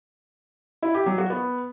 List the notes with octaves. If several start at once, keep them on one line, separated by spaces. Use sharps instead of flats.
E4
G4
F#3
F#4
B3